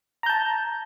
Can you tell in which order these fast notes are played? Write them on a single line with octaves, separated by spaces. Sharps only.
A#5 G6 A5